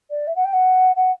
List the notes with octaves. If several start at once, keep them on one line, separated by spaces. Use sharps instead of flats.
D5
E5
F#5
G5
F#5
F#5